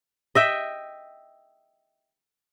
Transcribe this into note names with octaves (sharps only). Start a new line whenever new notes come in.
D#5 E5 G5